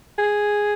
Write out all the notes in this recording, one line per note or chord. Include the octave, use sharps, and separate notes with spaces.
G#4